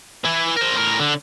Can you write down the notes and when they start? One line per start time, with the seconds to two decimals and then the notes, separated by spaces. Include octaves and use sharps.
0.25 E3 E4
0.57 A#4 C5
0.77 A2 A#4
1.00 D3